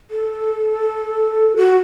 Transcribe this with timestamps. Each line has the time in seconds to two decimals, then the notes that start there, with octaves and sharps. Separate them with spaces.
0.11 A4
1.57 F#4